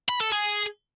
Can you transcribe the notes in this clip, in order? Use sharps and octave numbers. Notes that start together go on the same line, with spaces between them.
B5
A4
G#4